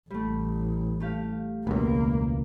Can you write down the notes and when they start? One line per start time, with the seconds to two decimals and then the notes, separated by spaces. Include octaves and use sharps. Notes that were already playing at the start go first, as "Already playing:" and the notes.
0.10 A1 G3 A3
1.00 A3 G4 F5
1.67 E1 C#2 A#3 B3